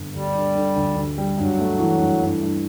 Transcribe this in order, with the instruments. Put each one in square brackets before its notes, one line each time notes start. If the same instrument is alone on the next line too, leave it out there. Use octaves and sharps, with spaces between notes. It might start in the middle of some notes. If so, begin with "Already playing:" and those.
Already playing: [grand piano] G1
[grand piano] D2 [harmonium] G3
[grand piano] D3
D3
D2
D2
G3
[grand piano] G2 [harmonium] F#3
[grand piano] A3
E3
G2
G2
G2